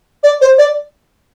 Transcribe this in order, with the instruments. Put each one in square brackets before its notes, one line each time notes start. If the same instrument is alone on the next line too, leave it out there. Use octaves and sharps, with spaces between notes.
[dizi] D5
C5
D5